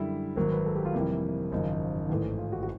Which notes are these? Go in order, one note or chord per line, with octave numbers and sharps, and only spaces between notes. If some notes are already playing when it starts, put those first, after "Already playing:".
Already playing: F#2 D3 G3 E4
G#1 G#2 D#3 F#3 A#4
B4
A4
G4
F4
F2 C3 E3 G3 A#3 E4
G#1 F#2 C#3 F3 D#4
A1 G#2 E3 A3
F4
F#4
F#4